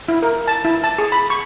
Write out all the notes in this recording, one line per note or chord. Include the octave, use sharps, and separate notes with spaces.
E4
A#4
A5
E4
A5
G#4
B5
C#6